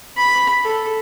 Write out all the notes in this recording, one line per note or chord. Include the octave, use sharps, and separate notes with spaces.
B5
A4